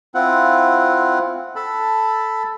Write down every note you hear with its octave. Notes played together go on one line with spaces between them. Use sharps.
C4 E4 F4 F#5
A4 A5 B5